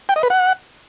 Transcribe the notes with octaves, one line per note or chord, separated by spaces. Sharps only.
G5
D#5
B4
F#5